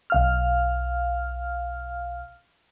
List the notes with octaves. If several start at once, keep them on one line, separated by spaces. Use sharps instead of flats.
B1 F5 F6